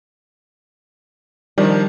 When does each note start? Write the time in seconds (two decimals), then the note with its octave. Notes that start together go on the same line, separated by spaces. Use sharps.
1.58 D#3 F3 G3 D4